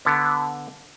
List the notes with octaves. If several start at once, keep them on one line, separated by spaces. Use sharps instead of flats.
D3 B3